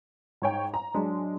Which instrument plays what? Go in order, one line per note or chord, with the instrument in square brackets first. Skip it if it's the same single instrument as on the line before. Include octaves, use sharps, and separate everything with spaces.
[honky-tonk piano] G#2 C#5 G5
A#5
[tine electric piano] F#3 D4 [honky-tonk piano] G#3